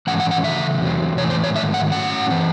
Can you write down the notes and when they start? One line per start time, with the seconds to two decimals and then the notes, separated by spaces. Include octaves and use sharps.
0.07 G#2 E3 A3 C#4 F#5
0.20 F#5
0.31 F#5
0.43 C#3 E3 A3 E5
0.81 E2 C3 F#3 C4
1.18 A2 E3 A3 C#5
1.30 C5
1.44 C#5
1.55 G#2 D#3 A3 E5
1.74 F#5
1.92 A2 F#3 C#4 F#5
2.30 E3 C4